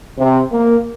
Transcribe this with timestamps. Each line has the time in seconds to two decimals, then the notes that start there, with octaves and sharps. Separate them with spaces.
0.19 C3
0.52 A#3